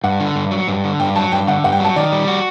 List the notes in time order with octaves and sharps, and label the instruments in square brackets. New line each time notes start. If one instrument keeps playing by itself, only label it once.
[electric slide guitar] G2 [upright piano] F#5
[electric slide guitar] D3
G2
F#3
G2
D3
[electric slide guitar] G2 [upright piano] G5
[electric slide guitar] F#3 [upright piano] A5
[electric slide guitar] G2 [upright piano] G5
[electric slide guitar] D3 [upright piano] F#5
[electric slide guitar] G2 [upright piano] F#5
[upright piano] G5
[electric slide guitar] F#3 [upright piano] A5
[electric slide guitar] D#3 [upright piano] D5
[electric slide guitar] G3
F#4